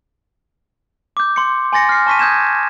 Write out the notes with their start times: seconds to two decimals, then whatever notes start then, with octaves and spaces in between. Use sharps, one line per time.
1.17 D6 G6
1.36 C6 C#7
1.73 G#5 C6 A6 A#6 C#7
1.89 F6 C7
2.07 A5 C#6 B6 D#7
2.19 D#6 G6 G#6 E7